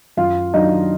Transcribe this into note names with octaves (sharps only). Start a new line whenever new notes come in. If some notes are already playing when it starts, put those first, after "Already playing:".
F#2 F4 F5
D#3 F#3 D4 D#4 D#5